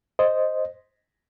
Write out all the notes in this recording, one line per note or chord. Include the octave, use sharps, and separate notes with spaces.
C5 D#5